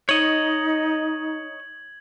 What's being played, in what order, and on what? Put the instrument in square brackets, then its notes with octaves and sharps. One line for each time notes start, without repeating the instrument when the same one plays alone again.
[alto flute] D#4 [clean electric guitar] C#5 D#5 [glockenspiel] G#6 F#7